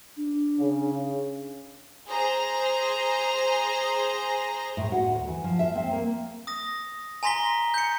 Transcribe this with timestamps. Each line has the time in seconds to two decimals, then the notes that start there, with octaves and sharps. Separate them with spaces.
0.17 D4
0.59 C#3
2.09 G#4 C5 A#5
4.77 A2
4.92 F#4
5.11 D2
5.28 E3
5.44 F3
5.59 E5
5.75 C4
5.91 A#3
6.47 D#6 A#6
7.23 G#5 A#5 C6 A#6 B6 G7
7.74 G6 C#7